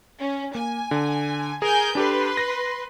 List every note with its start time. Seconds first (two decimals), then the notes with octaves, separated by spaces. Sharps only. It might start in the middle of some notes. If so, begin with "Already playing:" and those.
0.19 C#4
0.55 A#3 G#5
0.91 D3
1.62 G#4 A#4 G#5 G6
1.95 D4 G4 A4 B4 C6
2.37 A#6